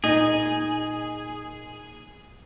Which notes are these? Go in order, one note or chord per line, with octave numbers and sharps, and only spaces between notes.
A#2 D#4 G#4 D#5